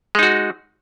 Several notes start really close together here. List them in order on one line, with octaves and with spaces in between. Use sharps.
G#3 D#4 F#4